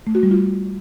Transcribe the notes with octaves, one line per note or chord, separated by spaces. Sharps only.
A3
F#4
G3
F4